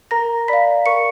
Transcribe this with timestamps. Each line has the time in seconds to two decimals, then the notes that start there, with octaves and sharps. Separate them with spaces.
0.11 A#4 A#5 A#6
0.48 D5 F5 B5 B6
0.86 A#4 C#6 C#7